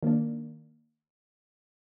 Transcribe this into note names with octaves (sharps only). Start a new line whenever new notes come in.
D#3 A#3 D4